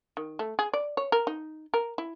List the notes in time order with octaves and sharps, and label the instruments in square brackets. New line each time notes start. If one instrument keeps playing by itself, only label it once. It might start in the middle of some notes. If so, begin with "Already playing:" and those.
[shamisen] D#3
A3
G#4
D5
C#5
A#4
D#4
A#4
E4